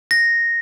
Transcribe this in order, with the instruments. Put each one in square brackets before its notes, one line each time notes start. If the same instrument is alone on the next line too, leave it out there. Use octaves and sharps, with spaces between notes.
[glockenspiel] A#6